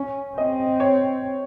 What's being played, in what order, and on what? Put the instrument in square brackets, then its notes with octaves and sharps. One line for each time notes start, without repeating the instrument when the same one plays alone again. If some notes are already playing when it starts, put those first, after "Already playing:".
Already playing: [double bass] C#4
[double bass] C4 [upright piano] D#5
[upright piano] C#5